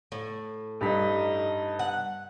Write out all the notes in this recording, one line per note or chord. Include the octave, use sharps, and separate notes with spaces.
A2
G2 D#4 B6
F#5